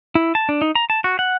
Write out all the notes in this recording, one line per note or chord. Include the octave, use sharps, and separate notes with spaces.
E4
A5
D4
D#4
A#5
A5
F#4
F#5